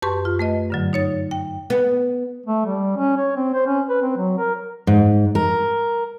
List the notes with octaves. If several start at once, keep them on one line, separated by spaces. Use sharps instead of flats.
F#2 G4 B4 A5 C6 C#6
F4
A3 B4 D#5
G2 D3 F#3
D#4 C#5 A6
G5
B3
A3
G3
C#4
C#5
C4
C5
C#4
B4
C4
F#3
A#4
G#2
A#4